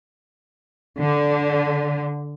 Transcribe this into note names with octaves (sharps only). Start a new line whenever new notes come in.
D3